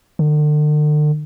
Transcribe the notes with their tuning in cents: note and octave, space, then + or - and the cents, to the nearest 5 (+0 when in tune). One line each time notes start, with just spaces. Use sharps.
D3 +40